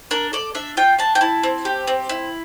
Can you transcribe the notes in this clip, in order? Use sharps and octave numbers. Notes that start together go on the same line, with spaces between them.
D4 A#4
A4 D5
D4 E5
F4 G5
D4 A5
G5
E4 A5
C4
G4
C4
E4